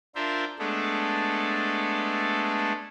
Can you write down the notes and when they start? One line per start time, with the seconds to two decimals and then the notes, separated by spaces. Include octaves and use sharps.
0.15 D4 F4 A#4 C5 E5
0.59 G#3 A3 B3 D4 A4